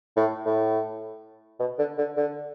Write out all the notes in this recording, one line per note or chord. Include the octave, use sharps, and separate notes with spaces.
A2
A2
B2
D3
D3
D3